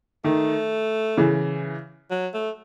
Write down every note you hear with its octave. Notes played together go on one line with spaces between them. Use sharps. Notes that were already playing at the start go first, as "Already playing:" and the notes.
D#3 A3
C#3 E3
F#3
A3